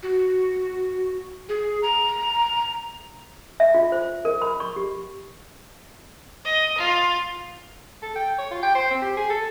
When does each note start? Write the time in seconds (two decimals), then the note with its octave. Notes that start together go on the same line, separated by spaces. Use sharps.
0.03 F#4
1.49 G#4
1.82 A#5
3.60 E5
3.74 F4
3.92 C5
4.25 A#4
4.42 B5
4.60 C#6
4.76 G4
6.45 D#5
6.78 F4
8.03 A4
8.16 G5
8.39 C#5
8.51 F4
8.63 G5
8.75 C5
8.91 C4
9.02 G4
9.17 G#4
9.30 A4